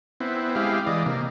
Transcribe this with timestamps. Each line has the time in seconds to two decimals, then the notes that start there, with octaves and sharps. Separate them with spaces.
0.20 B3 C4 E4
0.55 G#3 E4 G4 F5
0.86 E3 G#3 D5 D#5
1.06 C3 A#3